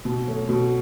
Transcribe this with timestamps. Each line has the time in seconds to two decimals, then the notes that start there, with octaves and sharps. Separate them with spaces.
0.05 B2
0.27 F#3 A3
0.49 B2